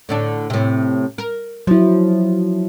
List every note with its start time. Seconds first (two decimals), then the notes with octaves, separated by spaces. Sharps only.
0.09 A2 D3 D4
0.50 A2 C3
1.18 A#4
1.67 F3 F#3 E4